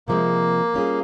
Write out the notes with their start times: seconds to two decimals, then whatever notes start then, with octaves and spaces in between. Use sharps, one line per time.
0.08 C3 F3 G#3 A#3 C4
0.74 G3 C#4 F4 G#4